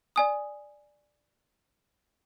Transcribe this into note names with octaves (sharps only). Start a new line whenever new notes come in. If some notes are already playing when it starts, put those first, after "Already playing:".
D5 G#5 D#6